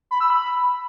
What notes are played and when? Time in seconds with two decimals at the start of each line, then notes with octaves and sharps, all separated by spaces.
0.11 B5
0.20 E6
0.30 B5